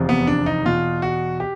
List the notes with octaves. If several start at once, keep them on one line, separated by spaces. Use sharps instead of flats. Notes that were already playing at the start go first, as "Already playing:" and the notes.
Already playing: F1 E2 C3 F3
B3
D4
D#4
E2 B2 F4
F#4
G4